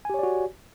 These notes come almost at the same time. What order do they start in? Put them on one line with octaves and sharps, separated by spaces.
G#5 G4 C#5 D5 F#4